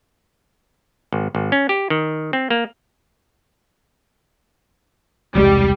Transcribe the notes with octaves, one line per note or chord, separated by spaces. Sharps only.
G#1
G#1
C#4
G4
D#3
C4
A#3
E1 C2 G3 G#3